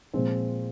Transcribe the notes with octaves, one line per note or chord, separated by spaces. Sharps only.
A#2 F3 G#3 C4